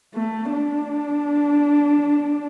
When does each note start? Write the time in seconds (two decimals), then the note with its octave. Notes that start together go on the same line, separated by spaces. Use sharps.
0.14 A3
0.52 D4